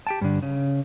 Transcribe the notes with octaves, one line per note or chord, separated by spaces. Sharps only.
G4 G5 A5
G2 D3
C#3